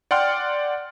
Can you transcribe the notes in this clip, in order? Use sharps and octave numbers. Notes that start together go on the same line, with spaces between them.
D5 F#5 G5 C6 F6